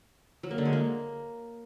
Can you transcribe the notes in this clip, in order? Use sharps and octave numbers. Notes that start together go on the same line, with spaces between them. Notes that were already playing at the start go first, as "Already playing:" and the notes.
F#3
A#3
D3
G#3
A#3